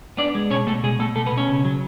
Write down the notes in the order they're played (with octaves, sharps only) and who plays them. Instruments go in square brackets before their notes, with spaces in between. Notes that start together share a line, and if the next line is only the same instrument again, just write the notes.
[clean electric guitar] B3 D4 D5
G#3
B2 C#4 C#5
B2 A3 A4
B2 G#3 G#4
B2 A3 A4
B2 A3 A4
B3 B4
B2
C#4 C#5
C#3
F#3